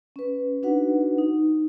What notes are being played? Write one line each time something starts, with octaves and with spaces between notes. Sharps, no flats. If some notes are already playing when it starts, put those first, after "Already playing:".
C#4 B4
D4 D#4 F#4 B4 F#5
D#4